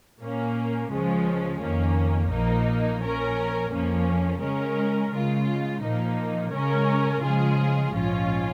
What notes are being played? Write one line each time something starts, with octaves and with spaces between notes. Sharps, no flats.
A#2 A#3 C#4
C#2 C#3 F3 G#3 C#4
F2 D#3 A#3 C#4
A#1 A#2 F3 A#3 D#4
A#2 F3 C#4 A#4
F2 F3 A#3 C#4
C#3 G#3 C#4 A#4
C#3 G#3 F4
A#2 F3 A#3 D#4
C#3 G#3 C#4 A#4
C#3 F3 G#3 F4 G#4
A#1 G#2 F3 C#4 F4